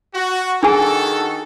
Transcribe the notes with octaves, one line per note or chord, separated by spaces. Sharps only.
F#4
D#3 D4 F#4 G#4 A4 G#5